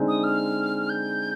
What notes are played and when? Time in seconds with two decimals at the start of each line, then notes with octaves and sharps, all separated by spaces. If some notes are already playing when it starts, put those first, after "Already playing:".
Already playing: D3 G#3 C4 D#4
0.08 D#6
0.24 F6
0.89 G6